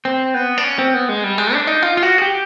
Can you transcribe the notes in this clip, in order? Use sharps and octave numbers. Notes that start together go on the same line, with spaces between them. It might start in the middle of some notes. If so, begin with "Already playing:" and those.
C4
B3
D4
C#4
C4
B3
G#3
G3
G#3
D4
D#4
F4
F4
F#4
G#4
G4